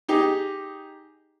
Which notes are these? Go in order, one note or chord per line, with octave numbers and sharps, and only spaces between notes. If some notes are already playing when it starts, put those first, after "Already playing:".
D#4 G4 G#4